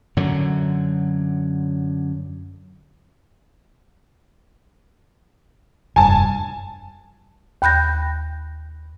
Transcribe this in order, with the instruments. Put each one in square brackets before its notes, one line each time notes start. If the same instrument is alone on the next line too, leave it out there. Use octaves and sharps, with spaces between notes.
[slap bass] F#2 D3 F#3
[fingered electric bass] F1 G2 [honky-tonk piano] G#5 A5
[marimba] D#2 B5 F#6 G6 A#6